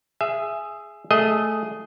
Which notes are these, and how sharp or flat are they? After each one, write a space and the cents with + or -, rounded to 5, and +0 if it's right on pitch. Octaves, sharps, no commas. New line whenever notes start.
G#4 +0 E5 +20
A3 -10 G#4 +0 D#5 +10